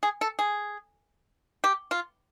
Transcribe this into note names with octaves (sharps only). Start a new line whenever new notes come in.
G#4
A4
G#4
G4
F4